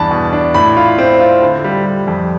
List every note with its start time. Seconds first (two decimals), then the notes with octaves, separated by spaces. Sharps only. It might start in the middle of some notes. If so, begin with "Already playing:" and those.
Already playing: E2 G2 D4 A5 B5
0.11 B2
0.33 D4
0.54 A2 B5
0.77 F4
0.98 C4
1.20 F4
1.42 D3
1.64 G3
1.86 G3
2.07 F2